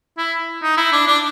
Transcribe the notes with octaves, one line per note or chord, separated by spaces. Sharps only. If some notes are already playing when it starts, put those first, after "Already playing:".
E4
D#4
E4
D4
D4